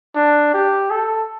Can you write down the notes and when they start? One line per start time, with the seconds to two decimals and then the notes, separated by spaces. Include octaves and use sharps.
0.16 D4
0.54 G4
0.91 A4